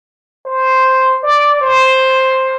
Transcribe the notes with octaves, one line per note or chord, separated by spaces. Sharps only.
C5
D5
C5